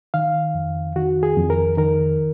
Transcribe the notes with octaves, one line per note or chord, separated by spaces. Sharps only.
D#3 F5
F2
D#3 F#4
G#4
F2
A#4
D#3 A#4